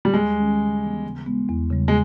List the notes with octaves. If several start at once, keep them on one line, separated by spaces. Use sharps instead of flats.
G3
D#2 G#3
D#3 G#3 C#4
C#3
E3 G#3 B3
C#3
G#3 B3
E2
C#3 G3
G#3